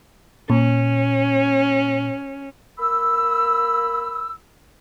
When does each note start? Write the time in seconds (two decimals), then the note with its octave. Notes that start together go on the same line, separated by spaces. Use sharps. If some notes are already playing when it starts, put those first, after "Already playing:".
0.50 A#2 C#4
2.78 A#3 B5 E6